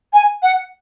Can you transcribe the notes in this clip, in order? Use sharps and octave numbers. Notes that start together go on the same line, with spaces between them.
G#5
F#5